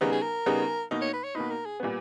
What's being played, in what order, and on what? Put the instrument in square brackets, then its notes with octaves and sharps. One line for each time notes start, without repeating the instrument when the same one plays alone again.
[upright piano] C#3 G3 B3 D#4 [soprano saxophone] A#4
[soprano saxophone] G#4
A#4
[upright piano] C#3 G3 B3 D#4
B2 A#3 D#4
[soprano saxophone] C#5
B4
C#5
[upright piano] B2 A#3 D#4 [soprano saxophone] B4
[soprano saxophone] A#4
G#4
[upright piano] A#2 G3 B3